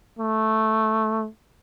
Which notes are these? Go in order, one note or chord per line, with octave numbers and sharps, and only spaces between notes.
A3